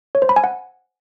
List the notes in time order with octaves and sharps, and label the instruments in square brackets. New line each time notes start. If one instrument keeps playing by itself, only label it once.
[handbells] C#5
C5
B5
G#5
F#5